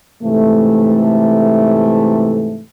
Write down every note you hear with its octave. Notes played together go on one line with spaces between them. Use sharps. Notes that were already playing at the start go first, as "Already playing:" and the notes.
G#2 C3 E3 A3